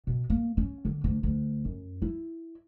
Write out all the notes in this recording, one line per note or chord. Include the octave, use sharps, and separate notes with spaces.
B2
A#3
C#4
D3
D2
D2
F#2
E4